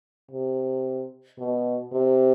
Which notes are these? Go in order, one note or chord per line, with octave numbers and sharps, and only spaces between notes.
C3
B2
C3